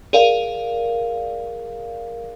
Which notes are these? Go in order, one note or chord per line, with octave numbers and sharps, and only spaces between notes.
G#4 A#4 D5 F5